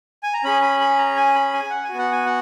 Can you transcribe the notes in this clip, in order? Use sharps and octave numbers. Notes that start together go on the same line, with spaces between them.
G#5
A#5
C#4 G#4 B5
B5
B5
A#5
G#5
B5
G#5
F#5
G#5
B3 F#4
F#5
G#5
F#5